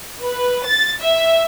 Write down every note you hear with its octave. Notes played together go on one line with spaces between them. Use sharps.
B4
A6
E5